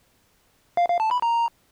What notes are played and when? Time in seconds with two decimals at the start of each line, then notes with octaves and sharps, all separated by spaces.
0.77 F5
0.89 F5
1.00 A5
1.11 B5
1.22 A#5